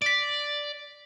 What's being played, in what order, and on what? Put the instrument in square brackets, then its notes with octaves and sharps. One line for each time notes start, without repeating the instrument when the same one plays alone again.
[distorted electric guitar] D5 [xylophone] B6 D7